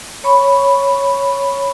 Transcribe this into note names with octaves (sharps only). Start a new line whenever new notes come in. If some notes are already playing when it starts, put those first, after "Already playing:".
C#5 B5 C#6